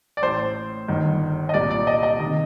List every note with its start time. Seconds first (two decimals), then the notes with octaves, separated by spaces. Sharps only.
0.17 D5
0.23 A1 A2 C5
0.88 G1 G2 D#3
1.49 D#5
1.54 C2 A#2 D5
1.71 D5
1.87 D#5
2.03 D#5
2.19 C3 D#3